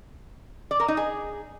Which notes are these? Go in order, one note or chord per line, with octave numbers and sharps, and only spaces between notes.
D5
A#4
D#4
G#4